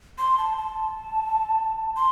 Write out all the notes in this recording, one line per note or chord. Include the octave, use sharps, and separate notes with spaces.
C6
A5
A5
C6